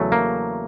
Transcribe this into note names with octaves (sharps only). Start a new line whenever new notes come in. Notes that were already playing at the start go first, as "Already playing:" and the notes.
Already playing: E2 C#3 F#3 A3
A#3